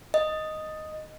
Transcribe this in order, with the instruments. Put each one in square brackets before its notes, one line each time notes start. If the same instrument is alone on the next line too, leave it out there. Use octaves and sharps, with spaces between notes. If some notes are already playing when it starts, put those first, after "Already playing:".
[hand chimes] D#5